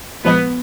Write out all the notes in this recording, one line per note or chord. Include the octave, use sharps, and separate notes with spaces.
A#2 F3 G#3 B3